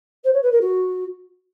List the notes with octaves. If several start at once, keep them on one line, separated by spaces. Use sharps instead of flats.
C5
C#5
B4
A#4
F#4